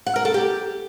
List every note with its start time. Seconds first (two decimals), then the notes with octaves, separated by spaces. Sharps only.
0.06 F#5
0.16 A#4
0.25 A4
0.34 G4